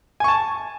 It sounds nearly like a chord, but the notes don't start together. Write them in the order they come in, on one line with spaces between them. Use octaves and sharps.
G#5 C#6 A5